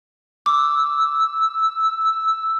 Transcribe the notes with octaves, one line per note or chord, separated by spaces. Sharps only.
D6 E6